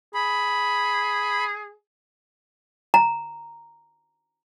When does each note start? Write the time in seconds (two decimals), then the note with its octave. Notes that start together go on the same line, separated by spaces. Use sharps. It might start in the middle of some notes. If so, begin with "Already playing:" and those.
0.14 G#4 B5
2.94 A#5